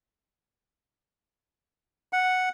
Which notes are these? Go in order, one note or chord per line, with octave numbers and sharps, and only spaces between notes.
F#5